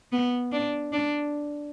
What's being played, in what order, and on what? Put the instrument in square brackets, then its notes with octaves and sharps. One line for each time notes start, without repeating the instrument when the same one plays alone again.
[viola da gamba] B3
D4
D4